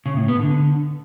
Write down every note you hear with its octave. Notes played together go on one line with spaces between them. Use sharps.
C#3
A2
B3
D3